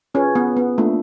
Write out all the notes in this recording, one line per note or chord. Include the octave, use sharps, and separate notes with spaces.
C#4 F4 G#4 B4
B3
B3
A3 A#3 D4 F4